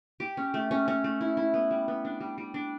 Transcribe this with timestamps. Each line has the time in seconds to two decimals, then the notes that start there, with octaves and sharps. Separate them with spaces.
0.20 G4
0.37 C#4
0.54 A3
0.71 C#4
0.88 C#4
1.04 A3
1.21 E4
1.37 E4
1.54 B3
1.71 G3
1.88 B3
2.05 D4
2.20 G3
2.38 G3
2.54 D4